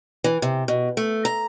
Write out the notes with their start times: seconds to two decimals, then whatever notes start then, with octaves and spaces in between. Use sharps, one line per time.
0.24 E3
0.42 C3
0.68 B2
0.97 A3
1.25 A#5